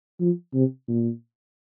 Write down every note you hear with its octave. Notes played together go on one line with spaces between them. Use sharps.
F3
C3
A#2